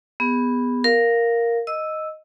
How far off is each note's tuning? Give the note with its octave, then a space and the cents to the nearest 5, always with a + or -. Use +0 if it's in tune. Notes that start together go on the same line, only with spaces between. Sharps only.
B3 +0 G#4 -30
A#4 +0 F5 +0
D#5 +0 E6 +0